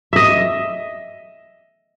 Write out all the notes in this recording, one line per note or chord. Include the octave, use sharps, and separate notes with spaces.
D#5 E5